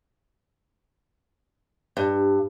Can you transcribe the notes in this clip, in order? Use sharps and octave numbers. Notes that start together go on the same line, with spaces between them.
G2